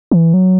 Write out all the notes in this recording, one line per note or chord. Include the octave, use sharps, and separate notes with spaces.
E3
F#3